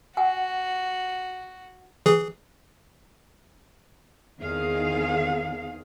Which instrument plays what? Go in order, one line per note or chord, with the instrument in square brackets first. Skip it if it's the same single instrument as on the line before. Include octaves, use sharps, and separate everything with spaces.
[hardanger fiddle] F#4 [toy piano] F#5 G#5
[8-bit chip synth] E3 G#4
[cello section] E2 D#3 C4 D#4 G#4 F5